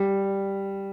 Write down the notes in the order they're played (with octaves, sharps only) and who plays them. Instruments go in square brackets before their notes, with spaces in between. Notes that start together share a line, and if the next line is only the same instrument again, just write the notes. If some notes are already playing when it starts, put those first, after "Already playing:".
Already playing: [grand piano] G3